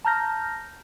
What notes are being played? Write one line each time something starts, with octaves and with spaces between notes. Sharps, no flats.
A5 A#5 F6 G6 A#6